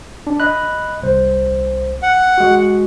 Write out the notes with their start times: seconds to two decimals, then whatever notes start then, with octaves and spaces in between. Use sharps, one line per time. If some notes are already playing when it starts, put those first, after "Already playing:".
0.27 D4
0.40 D#5 B5 F#6
1.02 C2 C5
2.03 F#5
2.38 G#3 F#4